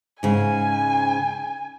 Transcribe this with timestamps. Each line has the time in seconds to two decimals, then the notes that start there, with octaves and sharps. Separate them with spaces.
0.23 G#2 C#3 G#5